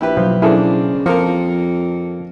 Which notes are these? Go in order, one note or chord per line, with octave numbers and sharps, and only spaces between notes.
A#1 E4 G4 B4
B2 F3 F#3
C#3 A#3 C4 D4 E4 G#4 A4
F2 F3 A#3 A4 A#4 C#7